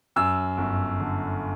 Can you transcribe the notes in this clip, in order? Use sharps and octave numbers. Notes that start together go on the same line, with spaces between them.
F#2 E6
G1
D3